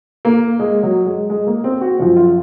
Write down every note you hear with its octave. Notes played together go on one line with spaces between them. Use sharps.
A#3
G#3
F#3
G#3
G#3
A#3
C4
F#4
F#2 F3 F4
F4